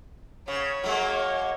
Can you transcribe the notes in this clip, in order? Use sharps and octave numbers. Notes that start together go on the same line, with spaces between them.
C#3 C#5
F#3 G#3 A#3